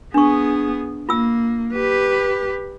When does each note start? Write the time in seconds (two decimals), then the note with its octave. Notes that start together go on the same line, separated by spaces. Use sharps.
0.14 B3 D4 G#4 C#6
1.09 A#3 F4 E6
1.73 G4 B4